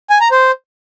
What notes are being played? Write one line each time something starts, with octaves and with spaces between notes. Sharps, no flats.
G#5
A#5
C5